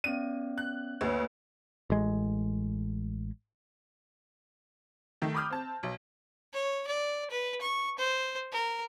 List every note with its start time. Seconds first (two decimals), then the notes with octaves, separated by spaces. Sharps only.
0.04 B3 C#4 D5 D#7
0.58 F#6
1.01 D2 A#3 B4 C#5
1.90 A1 G#3
5.22 D#3 A3
5.34 B5 D6 D#6 F6 G6
5.50 C4 A5
5.83 B1
6.54 C#5
6.88 D5
7.31 B4
7.61 C#6
7.99 C5
8.52 A#4